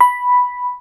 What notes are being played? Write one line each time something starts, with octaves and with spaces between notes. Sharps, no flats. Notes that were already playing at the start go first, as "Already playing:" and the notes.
B5